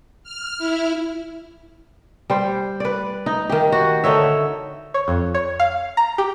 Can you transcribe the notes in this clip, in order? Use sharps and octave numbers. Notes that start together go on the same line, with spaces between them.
F6
E4
G3 C5
B4 D5
D#4
D#3 G4
F#4
D3 D#4 C#5 E5
C#5
F2
C#5
F5
A#5
G4